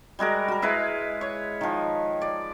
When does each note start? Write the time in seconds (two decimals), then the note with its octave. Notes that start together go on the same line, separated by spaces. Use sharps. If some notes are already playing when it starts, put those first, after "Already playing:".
0.19 G3 G#3 F#4 A#4
0.48 F#4 A#4
0.62 G#3 E4 B4 F5
1.21 C#5
1.61 D#3 F3
2.22 D5